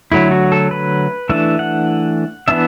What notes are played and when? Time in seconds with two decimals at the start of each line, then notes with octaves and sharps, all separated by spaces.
0.12 D3 F#3 A3 E4
0.31 F#4
0.52 A4
0.71 B4
1.29 E3 A3 D4 E5
1.59 F#5
2.48 E3 B3 D4 E5